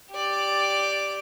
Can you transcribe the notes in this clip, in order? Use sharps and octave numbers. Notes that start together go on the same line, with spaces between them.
G4 D5